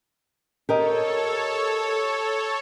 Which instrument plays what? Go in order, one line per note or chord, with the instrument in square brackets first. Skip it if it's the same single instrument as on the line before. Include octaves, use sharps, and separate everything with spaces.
[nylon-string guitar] G4 A#4 D#5 [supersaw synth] A4 C#5